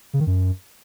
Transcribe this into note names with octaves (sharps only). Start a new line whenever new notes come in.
C#3
D#3
F#2